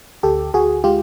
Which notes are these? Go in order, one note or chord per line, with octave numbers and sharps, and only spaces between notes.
D2 G4 A4
D2 F#4 G#4
G#3 F4 G4